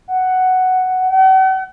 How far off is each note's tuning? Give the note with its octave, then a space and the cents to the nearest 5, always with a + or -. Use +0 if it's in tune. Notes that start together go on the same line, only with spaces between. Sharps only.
F#5 +5
F#5 +45